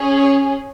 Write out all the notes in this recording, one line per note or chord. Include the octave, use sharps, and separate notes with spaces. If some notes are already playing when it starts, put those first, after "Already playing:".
Already playing: C#4 G#4
C#5